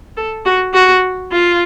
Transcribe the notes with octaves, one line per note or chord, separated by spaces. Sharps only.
A4
F#4
F#4
F4